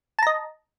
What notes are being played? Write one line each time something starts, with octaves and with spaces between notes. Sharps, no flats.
D#5 A5 A#5